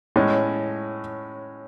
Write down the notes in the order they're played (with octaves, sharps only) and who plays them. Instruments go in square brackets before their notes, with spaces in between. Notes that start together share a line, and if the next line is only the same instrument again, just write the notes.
[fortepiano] A2 G#3 C#4